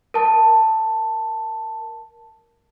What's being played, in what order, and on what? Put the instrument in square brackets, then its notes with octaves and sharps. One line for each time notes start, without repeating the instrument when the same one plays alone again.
[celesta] A#4 A5